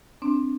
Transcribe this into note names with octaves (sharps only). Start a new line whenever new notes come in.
C4 D4